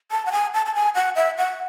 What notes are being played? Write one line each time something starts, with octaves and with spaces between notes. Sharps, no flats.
A5
F#5
G#5
A5
A5
G#5
F#5
E5
F#5